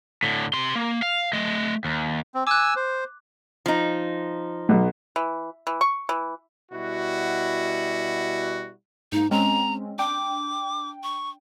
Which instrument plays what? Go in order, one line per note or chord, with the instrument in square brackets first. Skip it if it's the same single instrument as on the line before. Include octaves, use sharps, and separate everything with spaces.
[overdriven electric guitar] A2 D3
C3 C6
A#3
F5
A3 D#5
D#2
[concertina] C4
[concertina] G#5 E6 [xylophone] D6 F#6
[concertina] C5
[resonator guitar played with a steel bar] F3 D#4
[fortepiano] B1
[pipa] E3
E3
C#6
E3
[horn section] B2 G3 E4 F#4
[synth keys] G#2 A#3 [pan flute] D#4
[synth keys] G#3 C4 C#4 [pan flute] A#5
[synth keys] D4 G5 [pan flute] D6
[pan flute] C#6